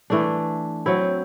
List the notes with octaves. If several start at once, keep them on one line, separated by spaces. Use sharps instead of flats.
E3 A3 D4
F#3 C4 E4